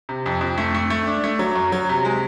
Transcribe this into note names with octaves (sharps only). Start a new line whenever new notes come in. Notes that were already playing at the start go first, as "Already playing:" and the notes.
C3
F2
F2
A3
A3
A3
D4
A3
F#3
F#2
F#3
C3
G#3